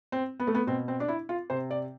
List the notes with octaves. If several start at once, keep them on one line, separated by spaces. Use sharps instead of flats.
C4
B3
A3
B3
B2 C4
C4
D4
E4
F4
C3 C5
D5